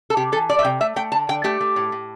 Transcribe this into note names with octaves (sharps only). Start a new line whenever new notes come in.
A4
C3 G4
E3 A4
G3 D5
E5
C3 G5
A3 E5
A3 G5
D3 A5
D3 G5
A3 G4
A3
A2
A2